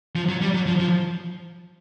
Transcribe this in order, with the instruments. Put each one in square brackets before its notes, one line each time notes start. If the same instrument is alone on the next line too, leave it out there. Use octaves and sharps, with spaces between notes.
[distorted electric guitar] F3
F#3
G3
F#3
F3
F3